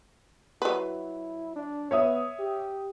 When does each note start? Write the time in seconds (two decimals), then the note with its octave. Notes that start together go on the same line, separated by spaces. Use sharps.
0.62 F#3 E4 B4
1.56 D4
1.91 B3 C#5 E5 D#6
2.39 G4